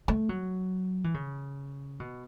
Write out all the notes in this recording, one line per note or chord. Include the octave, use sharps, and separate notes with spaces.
A3
F#3
E3
C#3
B2